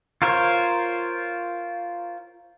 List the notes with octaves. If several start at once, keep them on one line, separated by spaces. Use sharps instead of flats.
F4 A#4 C5 C#5